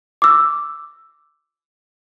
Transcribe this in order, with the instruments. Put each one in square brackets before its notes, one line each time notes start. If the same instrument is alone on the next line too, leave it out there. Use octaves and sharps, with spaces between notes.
[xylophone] D6 E6